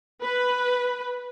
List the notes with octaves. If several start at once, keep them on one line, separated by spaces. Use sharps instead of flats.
B4